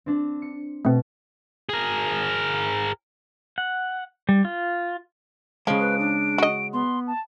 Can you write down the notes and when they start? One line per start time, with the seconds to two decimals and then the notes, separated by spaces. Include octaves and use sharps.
0.06 C4 D4
0.42 C#7
0.85 B2 A3 C4
1.69 G#4 A#4
3.58 F#5
4.29 G3
4.45 F4
5.67 C#3 F3 G#3 D7
5.80 B4
5.99 D4
6.38 F#4 D#5
6.73 B3 C6
7.07 A5